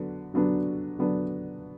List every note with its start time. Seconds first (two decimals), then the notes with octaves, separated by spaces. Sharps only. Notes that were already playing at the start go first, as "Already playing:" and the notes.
Already playing: D3 F#3 B3 D4
0.34 D3 F#3 B3 D4
0.99 D3 F#3 B3 D4